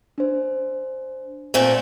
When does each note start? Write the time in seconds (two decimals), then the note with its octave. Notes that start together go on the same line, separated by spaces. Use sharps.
0.18 D4 C5
1.54 A#2 A3 C4